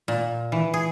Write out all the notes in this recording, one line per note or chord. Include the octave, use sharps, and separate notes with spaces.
A#2
E3
G#4